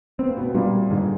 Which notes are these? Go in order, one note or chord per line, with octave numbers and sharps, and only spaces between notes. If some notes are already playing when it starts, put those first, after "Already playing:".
B3 C4
A#3
B2 B3
B3
A#2 G3 A#3
G#2 D3 G#3